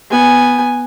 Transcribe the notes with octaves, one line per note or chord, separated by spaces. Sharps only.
B3 G#5